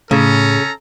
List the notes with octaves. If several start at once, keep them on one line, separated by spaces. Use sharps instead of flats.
A2 C#3 C#4 A4 A#5